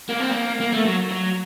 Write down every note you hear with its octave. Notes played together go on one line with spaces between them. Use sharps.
A#3
C4
A#3
A#3
A3
F#3
F#3